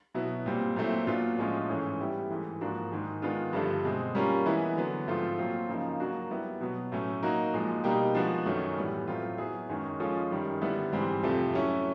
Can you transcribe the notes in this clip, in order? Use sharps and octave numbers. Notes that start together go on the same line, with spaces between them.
B2 F#3 B3 E4
A#2 G3 C4
A#2 F#3 A3 C4 E4
A#2 F#3 B3 D4 F4
A2 F3 G#3 C#4 F4
G#2 E3 A3 C#4
G3 B3 E4 G4
G#2 E3 A3
G#2 F3 A#3 D4 F#4
G#2 D#3 G#3
D#3 G#3 B3 D4 F4
G2 D3 F3 A3 D4
B2 G#3 C4
G3 A#3 C#4 F4 A#4
E3 G#3 B3 E4
D3 F#3 B3
G#2 F3 A3 C4 F4
A#2 F#3 A3 C4 F4
C#3 F3 A#3 D#4
F#3 A#3 D4 F#4
G3 B3 E4 G4
B2 F#3 B3
A2 F#3 A3 C#4
F#3 A#3 D#4 F#4
A#2 F3 G#3
B2 G3 A#3 D#4 G4
F3 G#3 B3 D4 F#4
F#2 D#3 F#3 A3 C#4
A2 E3 G3 B3
A2 F#3 A3 C4 F4
F#3 B3 E4 G#4
F#2 D#3 G#3 C#4 F#4
F3 G#3 C#4 F4 A4
F#2 D#3 G3
D3 G3 B3 E4 A4
G#2 E3 G3 C4
F2 C3 F3 A3
F#3 A3 C#4 E4